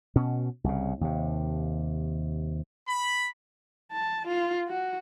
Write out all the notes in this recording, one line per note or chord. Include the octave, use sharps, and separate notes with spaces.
B2 C#4
C2 C#3
D#2 C3
B5
A5
F4
F#4